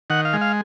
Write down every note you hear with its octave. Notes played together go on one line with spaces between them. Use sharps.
D#3 F#5
F5
G#3
F5